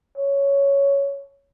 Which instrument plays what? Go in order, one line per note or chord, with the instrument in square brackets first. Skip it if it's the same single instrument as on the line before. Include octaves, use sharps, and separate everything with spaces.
[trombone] C#5